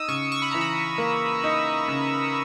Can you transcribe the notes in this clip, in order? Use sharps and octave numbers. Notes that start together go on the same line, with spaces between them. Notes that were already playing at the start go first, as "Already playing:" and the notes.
Already playing: D#4 D#6 E6
C#3 C#6
C#6
B5
E3 A#5
B5
A#3
D#4
C#3